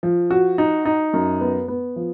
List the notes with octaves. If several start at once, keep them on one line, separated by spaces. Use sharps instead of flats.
F3
F#4
D#4
D#4
F#2
B3
B3
F3